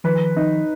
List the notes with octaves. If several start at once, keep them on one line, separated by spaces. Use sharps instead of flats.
D#3 F3 B4
D#4